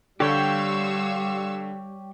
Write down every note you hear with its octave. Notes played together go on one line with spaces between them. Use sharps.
D3 G3 G4 C#5 F5 G5 C#6 E6